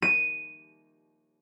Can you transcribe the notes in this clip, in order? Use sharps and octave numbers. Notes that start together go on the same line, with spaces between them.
D#7